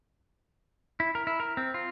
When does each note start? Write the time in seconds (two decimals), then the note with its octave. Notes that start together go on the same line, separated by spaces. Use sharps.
1.00 E4
1.15 A#4
1.27 E4
1.40 A#4
1.57 C4
1.74 F4